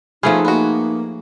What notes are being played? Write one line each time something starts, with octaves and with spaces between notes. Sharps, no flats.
F3 A3 B3 C#4 D#4 G#4
A#3 B3 F#4